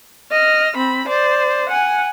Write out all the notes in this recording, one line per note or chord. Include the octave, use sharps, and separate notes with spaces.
D#5 F6
C4 B5
C5 D5
F#5 G#5